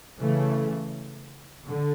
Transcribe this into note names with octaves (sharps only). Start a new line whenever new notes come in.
C#3 E3 A3
D3